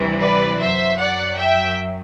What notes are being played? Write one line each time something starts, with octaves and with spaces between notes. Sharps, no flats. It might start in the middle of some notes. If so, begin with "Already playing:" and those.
Already playing: D2 C3 E3 G3
B4 D5
F#2 F#3 C5 E5
D5 F#5
E5 G5